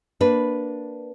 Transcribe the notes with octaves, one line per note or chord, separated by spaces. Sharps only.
A#3 D4 B4